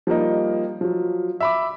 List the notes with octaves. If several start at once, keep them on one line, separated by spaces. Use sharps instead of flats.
F3 G3 A#3 D#4
F3 F#3
E5 B5 D6